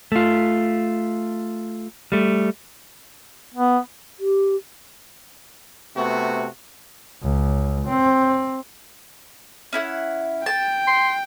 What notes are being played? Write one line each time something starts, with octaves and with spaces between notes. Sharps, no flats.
A3 F4
G3 A3
B3
G4
C3 A3 B3 F#4
C#2
C4
C#4 E4 F#5
G5 A5
C6